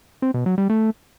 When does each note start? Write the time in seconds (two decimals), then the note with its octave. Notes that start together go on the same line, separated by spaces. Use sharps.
0.22 C4
0.34 B2
0.46 F#3
0.58 G3
0.70 A3